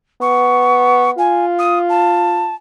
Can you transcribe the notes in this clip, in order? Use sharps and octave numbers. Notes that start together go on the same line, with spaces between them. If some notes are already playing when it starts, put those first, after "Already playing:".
B3 C#6
F4 G#5
D#6
A5